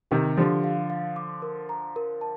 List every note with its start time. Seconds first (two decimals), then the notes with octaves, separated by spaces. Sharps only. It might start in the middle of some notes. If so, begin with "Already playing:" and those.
0.11 C3 D#3 G4
0.37 D3 F3 G4
0.64 F5
0.90 F5
1.16 D6
1.42 A#4
1.69 A#5
1.96 A#4
2.21 A5